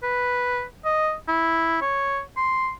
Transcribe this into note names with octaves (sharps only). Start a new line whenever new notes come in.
B4
D#5
E4
C#5
C6